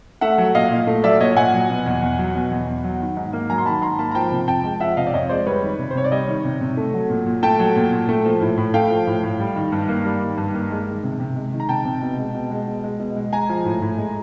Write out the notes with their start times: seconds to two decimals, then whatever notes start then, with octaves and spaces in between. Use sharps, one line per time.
0.21 A3 E5 F#5
0.38 F#3
0.55 A#2 D#5 F5
0.71 A#2
0.87 A3
1.04 F#3 D5 E5
1.20 A#2 C#5 D#5
1.37 A#2 F#5 G#5
1.54 F#3
1.70 B2
1.86 E2
2.02 E2
2.19 F#3
2.35 B2
2.51 E2
2.67 E2
2.84 F#3
3.00 D#3
3.17 G#2
3.33 A#3
3.50 F#3 G#5 A#5
3.58 C6
3.66 D#3 A5 B5
3.82 G#2 A#5 C6
3.99 A#3 A5 B5
4.11 A#5
4.15 F3 G5 A5
4.32 C3
4.48 F2 G5 A5
4.64 G#3
4.80 F3 E5 F#5
4.97 C3 D#5 F5
5.07 D5
5.13 F2 C#5 D#5
5.29 G#3 C5 D5
5.46 G3 B4 C#5
5.62 D#3
5.79 C3
5.91 C5
5.95 C3 C#5
6.05 D5
6.11 G3 C#5 D#5
6.28 D#3
6.45 C3
6.61 C3
6.77 A3
6.94 F#3
7.10 A#2
7.26 A#2
7.43 A3 G5 A5
7.59 F#3
7.76 A#2
7.92 A#2
8.09 A3
8.25 F3
8.41 A2
8.57 A2
8.74 A3 F5 G5
8.90 F3
9.07 A2
9.23 A2
9.40 G3
9.56 D#3
9.72 G2
9.88 A#3
10.05 G3
10.21 D#3
10.38 G2
10.54 A#3
10.71 G#3
10.87 D#3
11.04 C3
11.20 C3
11.36 G#3
11.52 D#3
11.60 A#5
11.69 C3 G5 A5
11.85 C3
12.02 B2
12.18 G#3
12.34 B2
12.51 G#3
12.67 B2
12.84 G#3
12.99 B2
13.16 G#3
13.33 G#3 G#5 A#5
13.49 F3
13.65 A2
13.82 A2
13.98 G#3